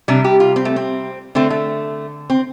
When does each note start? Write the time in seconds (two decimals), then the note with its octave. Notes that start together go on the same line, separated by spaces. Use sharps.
0.08 C3 G3 D4
0.24 G4
0.40 F4
0.56 C4
0.65 A3
0.76 C4
1.35 D3 A3 C4
1.50 A3
2.30 C4